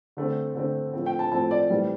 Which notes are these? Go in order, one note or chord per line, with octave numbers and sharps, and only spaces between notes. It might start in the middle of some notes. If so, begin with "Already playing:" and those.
D3 A3 C4
D3 A3 C4
A2 F3 A3 C4
G5
A5
A2 F3 A3 C4 A5
D5
A2 E3 G3 C4